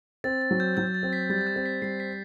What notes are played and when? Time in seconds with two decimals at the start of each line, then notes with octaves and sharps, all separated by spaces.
0.24 C4 A6
0.42 A6
0.51 F#3
0.60 G6
0.77 F#3 G6
0.94 A6
1.03 C4
1.13 B6
1.30 G3 A6
1.47 G6
1.56 C4
1.66 B6
1.82 G3 C7
2.00 B6